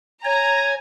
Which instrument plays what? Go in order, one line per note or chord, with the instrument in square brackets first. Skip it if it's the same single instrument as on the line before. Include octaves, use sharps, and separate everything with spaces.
[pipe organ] C#5 [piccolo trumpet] G#5 [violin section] A#5